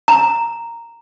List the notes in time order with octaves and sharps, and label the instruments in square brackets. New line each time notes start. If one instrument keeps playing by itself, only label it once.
[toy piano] A#5